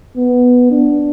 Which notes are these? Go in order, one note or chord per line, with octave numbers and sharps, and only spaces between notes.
B3
D4